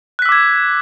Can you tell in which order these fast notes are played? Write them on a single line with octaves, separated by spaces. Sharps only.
F#6 B6 E6 D6 G#6